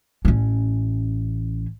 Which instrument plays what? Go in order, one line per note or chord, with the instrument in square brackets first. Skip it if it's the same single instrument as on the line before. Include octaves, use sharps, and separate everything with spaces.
[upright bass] A1 C#4